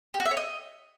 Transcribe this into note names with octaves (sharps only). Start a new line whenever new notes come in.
G4
F#4
E5
C#5
D#5